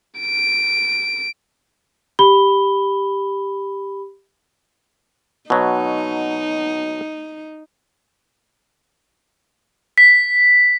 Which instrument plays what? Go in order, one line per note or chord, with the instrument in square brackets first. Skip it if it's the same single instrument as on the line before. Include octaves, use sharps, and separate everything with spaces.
[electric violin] D7
[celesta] G4 B5 G7
[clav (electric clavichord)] B2 F#3 [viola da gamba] D#4
[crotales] B6